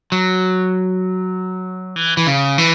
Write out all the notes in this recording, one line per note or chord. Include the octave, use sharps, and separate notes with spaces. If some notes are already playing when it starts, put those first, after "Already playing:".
F#3
E3
E3
C#3
E3